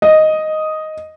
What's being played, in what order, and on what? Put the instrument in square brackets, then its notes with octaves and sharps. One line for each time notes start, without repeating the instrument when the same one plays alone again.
[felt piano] D#5